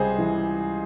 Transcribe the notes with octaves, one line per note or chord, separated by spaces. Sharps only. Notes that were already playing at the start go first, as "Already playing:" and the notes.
Already playing: C#2 C3 G3 G#4 C5
E3